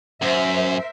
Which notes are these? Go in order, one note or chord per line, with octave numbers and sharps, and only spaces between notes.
F#2 A#4 C5 E5